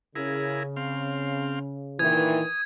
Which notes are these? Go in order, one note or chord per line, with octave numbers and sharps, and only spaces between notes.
C#3 E4 G#4 A#4
C4 F5
A#2 D#3 E3 D#6 G#6